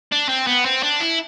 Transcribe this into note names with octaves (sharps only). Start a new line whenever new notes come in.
D4
C4
B3
C4
D4
E4